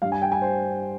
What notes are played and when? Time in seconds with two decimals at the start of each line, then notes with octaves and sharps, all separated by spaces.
0.02 G2 G3 F5
0.12 G#5
0.22 G5
0.32 G#5
0.42 C5